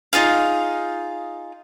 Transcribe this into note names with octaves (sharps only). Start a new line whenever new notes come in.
D#4 F4 G#4 F5